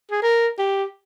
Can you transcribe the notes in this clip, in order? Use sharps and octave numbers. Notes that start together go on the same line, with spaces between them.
G#4
A#4
G4